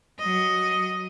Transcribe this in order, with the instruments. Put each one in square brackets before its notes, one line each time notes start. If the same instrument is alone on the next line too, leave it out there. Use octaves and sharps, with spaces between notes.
[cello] F#3 D#5